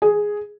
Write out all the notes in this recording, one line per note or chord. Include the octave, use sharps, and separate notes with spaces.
G#4